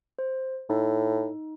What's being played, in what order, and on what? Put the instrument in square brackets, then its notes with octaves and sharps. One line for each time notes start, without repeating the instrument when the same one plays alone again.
[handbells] C5
[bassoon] A2 [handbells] D#4